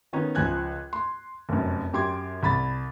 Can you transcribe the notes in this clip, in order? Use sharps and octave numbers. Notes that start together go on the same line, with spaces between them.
D#3 B3 C#4 D#4
C#2 F3 G#5 F#6 G#6
C6
F1 F#2
F#2 G4 C6 D6 G#6
C2 B5 A6